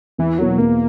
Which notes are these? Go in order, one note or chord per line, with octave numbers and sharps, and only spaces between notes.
E2 E3
B2 F#3 A#3 E4
E2 A#3